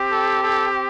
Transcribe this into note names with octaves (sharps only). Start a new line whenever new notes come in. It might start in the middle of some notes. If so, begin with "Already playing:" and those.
Already playing: C4 G4
A4
A4